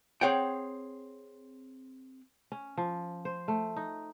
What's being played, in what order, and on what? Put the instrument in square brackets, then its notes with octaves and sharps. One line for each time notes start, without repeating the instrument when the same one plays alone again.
[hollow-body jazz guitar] C4 G#4 C#5 F#5 G5
[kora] C#4
F3
C5
A3
D#4